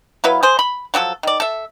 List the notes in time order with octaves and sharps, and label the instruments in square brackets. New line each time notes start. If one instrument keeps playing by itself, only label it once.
[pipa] F#3 E4 B4 F5
G#4 C5
B5
F3 F#3 G4 A4
D#3 D5
A4 E5